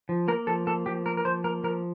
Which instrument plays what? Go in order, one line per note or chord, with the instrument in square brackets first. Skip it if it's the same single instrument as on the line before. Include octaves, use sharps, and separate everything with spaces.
[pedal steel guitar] F3
A#3 A#4
F3 A4
A#3 A4
F3 G4
A#3 A#4
A#4
F3 C5
A#3 A#4
F3 A#4